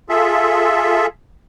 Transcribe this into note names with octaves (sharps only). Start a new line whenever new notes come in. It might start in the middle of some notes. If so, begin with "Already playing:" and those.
F4 G#4 A4 E5